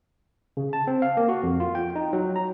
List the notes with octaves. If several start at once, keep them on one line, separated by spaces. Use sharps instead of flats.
C#3
A5
C4
F5
A#3
F#4
F2
F4
G5
D#4
F#3
A#5